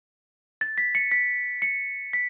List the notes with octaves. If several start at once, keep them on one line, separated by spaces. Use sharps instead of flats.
A6
B6
C#7
B6
C#7
B6